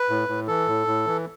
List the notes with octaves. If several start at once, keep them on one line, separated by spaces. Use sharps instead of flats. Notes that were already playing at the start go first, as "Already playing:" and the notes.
Already playing: B4
A2
A2
E3 A4
A2
A2
E3